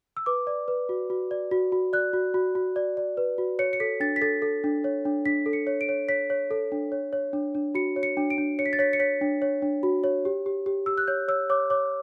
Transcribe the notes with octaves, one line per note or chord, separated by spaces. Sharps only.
E6
B4 D6
D5
B4
F#4
F#4
D5
F#4
F#4
D5 F#6
F#4
F#4
F#4
D5
D5
B4
F#4
C#5 C#7
C#7
A4 B6
D4 A6
B6
A4 A6
A4
D4
C#5
D4
D4 B6
A4
C#7
C#5
D7
C#5
C#5 B6
C#5
A4
D4
C#5
C#5
D4
D4
F#4 C#7
C#5
C#7
D4
D7
D4
C#5 C#7
B6
A6
C#5 B6
C#7
C#5 B6
D4
C#5
D4
F#4
C#5
G4
G4
G4
G4 E6
F#6
C#5 G6
C#5 E6
C#5 D6
C#5 D6